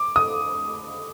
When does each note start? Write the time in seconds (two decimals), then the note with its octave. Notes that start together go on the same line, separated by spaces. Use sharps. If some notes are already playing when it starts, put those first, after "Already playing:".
Already playing: D6
0.16 D#6